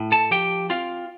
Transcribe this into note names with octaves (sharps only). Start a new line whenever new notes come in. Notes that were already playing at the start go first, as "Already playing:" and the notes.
Already playing: A2
A4 A5
F3 G4 G5
C4 F4 F5